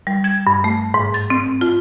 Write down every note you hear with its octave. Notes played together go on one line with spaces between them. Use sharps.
G3
G#6
G2
A3
G#2
A6
C4
F4